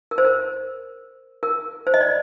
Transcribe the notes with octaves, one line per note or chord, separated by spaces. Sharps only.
A#4
C5
A#4
A#4
C5
D#5
D5